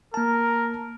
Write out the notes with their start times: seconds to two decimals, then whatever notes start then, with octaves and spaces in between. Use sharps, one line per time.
0.14 A#3 A#4 A5